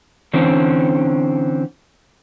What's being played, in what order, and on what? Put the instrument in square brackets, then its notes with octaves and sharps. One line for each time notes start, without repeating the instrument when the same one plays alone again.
[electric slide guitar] D3 E3 C4 C#4